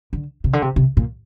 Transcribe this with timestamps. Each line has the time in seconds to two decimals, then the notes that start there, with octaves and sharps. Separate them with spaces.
0.13 D3
0.44 C3
0.53 D3
0.62 C3
0.76 C3
0.97 A#2